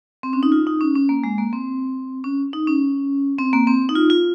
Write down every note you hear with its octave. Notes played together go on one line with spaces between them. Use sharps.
C4
C#4
D#4
F4
D#4
C#4
C#4
A#3
G#3
A#3
C4
C#4
D#4
C#4
C4
A#3
C4
D#4
F4
F4